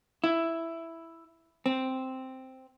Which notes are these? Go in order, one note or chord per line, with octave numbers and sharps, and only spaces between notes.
E4
C4